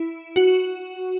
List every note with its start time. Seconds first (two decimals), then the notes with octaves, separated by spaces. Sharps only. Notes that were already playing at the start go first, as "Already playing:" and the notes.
Already playing: E4
0.36 F#4